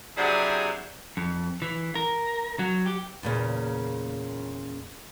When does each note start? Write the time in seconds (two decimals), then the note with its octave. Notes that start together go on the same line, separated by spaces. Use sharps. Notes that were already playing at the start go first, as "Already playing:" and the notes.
0.18 C3 F#3 D4 E4 G4 G#4
1.17 F2
1.62 E3
1.95 A#4
2.59 F#3
2.86 G4
3.23 E2 A#2 C#3